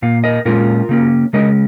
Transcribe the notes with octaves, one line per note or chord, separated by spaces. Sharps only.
A#2 A#3 F5
A#4 D#5
A#2 G#3 C#4 F4 A#4
C#3 A#3 C#4
C#3 G#3 C#4 A#4 D#5